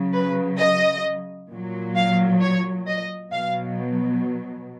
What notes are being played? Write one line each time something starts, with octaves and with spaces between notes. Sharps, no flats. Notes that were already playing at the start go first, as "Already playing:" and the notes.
Already playing: C#3 F#3
B4
D#5
A#2 F#3
F5
C#5
D#5
B2 F#3 F5